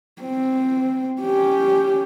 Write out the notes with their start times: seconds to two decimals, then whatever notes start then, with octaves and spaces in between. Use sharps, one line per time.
0.22 C4
1.21 C#4 G4